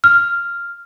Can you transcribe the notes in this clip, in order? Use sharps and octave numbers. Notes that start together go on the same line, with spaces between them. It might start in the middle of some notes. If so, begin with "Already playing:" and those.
F6